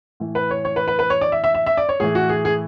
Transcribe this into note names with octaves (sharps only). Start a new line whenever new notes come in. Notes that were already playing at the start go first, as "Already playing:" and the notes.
A2 E3
B4
C#5
C#5
B4
B4
B4
C#5
D5
E5
E5
E5
E5
D5
C#5
A2 E3 G#4
F#4
G#4
G#4